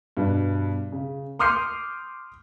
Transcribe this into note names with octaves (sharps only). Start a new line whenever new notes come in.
G2 B2
C#3
C6 D6 D#6 F6 G6 C7